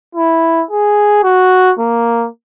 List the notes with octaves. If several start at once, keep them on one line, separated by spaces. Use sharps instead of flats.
E4
G#4
F#4
A#3